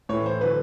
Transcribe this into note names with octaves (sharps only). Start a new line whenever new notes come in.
A2 E3 C#5
C5
D3 F#3 B4